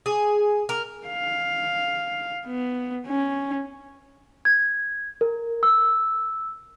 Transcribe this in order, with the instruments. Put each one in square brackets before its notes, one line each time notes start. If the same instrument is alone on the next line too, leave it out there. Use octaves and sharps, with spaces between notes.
[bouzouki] G#4
A#4
[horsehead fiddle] F5
B3
C#4
[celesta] G#6
A#4
E6